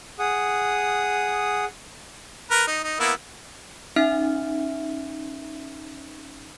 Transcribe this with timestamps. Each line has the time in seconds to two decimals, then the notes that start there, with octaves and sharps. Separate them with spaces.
0.19 G#4 F#5 D#6
2.51 A#4 B4
2.68 D#4
2.84 D#4
3.00 A#3 B3 E4
3.96 C#4 D#4 E5 F6